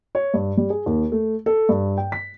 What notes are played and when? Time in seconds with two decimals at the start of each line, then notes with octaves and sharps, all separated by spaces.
0.15 C#5
0.34 G2
0.57 G3
0.70 G#4
0.86 D#2
1.12 A3
1.46 A4
1.69 G2
1.98 G5
2.12 B6